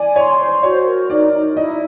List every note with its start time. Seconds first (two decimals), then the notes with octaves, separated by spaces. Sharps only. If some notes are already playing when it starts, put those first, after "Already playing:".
Already playing: D5 G#5
0.16 C#5 C6
0.39 C5
0.63 F#4 C#5
0.86 A#4
1.10 D#4 D5
1.33 D#4
1.56 E4 D#5